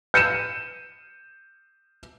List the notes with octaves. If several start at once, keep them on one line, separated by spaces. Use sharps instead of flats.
G6 C#7 D#7 E7